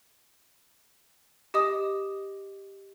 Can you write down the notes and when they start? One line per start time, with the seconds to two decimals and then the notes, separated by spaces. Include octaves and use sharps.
1.54 G4 D#5 D#6